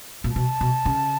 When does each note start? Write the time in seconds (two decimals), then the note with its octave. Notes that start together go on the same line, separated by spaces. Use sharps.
0.24 A#2
0.36 B2 A5
0.61 B2
0.86 C#3